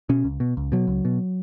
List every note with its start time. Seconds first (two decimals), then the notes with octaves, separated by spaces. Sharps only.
0.09 B2 C#4
0.24 C#2
0.40 B2
0.57 C#2
0.72 B2 F#3
0.88 C#2
1.05 B2